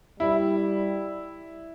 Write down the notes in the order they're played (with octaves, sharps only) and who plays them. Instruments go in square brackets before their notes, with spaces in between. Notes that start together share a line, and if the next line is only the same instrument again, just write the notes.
[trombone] G3 [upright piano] E4